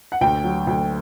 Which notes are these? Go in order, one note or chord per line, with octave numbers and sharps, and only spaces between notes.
F#5
D2 G5
F#3
D2